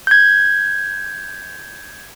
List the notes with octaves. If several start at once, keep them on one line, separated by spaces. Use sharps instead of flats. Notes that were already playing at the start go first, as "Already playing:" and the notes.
G6 G#6